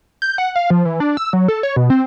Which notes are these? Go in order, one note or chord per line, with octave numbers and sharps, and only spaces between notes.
G6
F#5
F5
F3
E3
D4
E6
F#3
A4
C#5
B2
C4